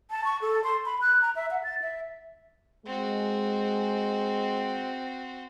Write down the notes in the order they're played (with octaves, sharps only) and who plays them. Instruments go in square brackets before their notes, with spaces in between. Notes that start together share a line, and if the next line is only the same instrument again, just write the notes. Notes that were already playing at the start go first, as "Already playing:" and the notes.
[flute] A5
C#6
A4
C6
B5
F#6
A#5
E5
F#5
A6
E5
[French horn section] G#3 [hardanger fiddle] C4 F#4